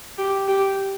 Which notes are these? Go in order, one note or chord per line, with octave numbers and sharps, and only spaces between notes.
G4
G4